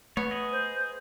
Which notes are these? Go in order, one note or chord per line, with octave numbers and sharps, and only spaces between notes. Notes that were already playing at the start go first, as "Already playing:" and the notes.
A3 B3 C#5
G#4 D#5
C5